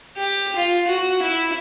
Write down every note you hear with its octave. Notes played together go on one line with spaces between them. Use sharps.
G4
F4
F#4
E4